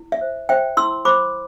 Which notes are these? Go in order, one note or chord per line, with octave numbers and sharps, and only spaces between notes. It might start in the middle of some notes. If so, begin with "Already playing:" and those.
Already playing: E4
E5
C5
C5 E5 G5
E4 C6 E6
C5 B5 D6